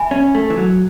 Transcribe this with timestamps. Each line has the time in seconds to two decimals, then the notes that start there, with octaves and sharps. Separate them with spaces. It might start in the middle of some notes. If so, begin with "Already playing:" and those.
Already playing: E5 G#5 B5
0.11 C#4
0.35 A3
0.50 E3
0.57 F#3